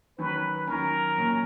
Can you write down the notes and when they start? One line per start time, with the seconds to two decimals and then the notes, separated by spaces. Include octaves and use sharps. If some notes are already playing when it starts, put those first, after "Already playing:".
0.18 D#3 F#3 C#4 B4
0.67 D#3 F#3 C#4 A#4
1.17 A#2 F#3 C#4